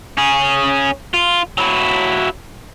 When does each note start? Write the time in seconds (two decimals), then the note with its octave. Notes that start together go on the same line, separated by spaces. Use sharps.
0.17 C#4 G#4
1.14 F4
1.58 F#3 E4